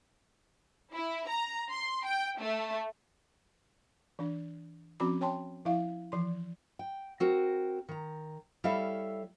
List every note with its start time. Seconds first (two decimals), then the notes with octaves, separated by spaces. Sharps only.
0.94 E4
1.28 A#5
1.71 C6
2.06 G5
2.40 A3
4.19 E3 D4
5.00 F3 C4 C#4 F#4 B5 D6
5.21 C#5 G5 A5 C6
5.65 F3 E4 E5 F5
6.12 E3 F3 C6
6.79 G5
7.20 C4 F#4 A#4
7.89 D#3 A#5
8.64 G3 E4 A4 C#5 E5 F5